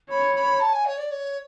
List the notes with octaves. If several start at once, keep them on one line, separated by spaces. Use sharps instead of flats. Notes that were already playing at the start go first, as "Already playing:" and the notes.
C#5 B5
B5
A5
G#5
C#5
D5
C#5